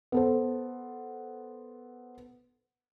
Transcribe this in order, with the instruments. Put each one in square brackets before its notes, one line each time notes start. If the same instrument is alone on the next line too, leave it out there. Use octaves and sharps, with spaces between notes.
[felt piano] B3 A4 C5